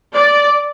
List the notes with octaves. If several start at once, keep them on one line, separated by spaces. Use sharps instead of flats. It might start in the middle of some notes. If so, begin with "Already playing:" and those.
D5